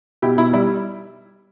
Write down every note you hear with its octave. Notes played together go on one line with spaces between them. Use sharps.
B2 E4 G4
B2 E4
G3 E4